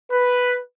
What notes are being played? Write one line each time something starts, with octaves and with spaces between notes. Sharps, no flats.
B4